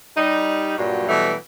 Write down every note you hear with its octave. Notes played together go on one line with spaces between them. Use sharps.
G3 D#4
G2 A#2 F#3
B2 E3 F#3 G3 A3